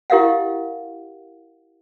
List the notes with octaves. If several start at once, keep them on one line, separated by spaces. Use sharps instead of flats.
E4 G4 A#4 D#5 F5 F#5